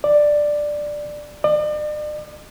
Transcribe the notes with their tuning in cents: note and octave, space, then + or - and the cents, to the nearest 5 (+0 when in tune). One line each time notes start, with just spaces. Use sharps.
D5 +10
D5 +45